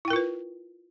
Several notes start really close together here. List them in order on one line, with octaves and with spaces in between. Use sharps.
E4 G5 A#4 F4 B4